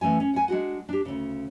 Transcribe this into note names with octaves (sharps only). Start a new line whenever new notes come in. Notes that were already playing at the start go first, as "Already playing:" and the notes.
E3 A3 C#4 G#5
C#4
F#5 G#5
G#3 D4 F#4 F#5
D4 G4
D2 C#3